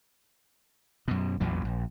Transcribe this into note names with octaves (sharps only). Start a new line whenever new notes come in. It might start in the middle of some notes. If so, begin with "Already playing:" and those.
F#2 B2
A1 E2 A#2 F#3
A#1